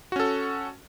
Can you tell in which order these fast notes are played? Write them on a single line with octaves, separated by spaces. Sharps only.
F#4 C#4 A4